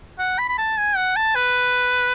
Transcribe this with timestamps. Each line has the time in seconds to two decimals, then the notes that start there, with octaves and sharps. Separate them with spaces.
0.19 F#5
0.38 B5
0.49 B5
0.58 A5
0.78 G#5
0.96 F#5
1.17 A5
1.36 B4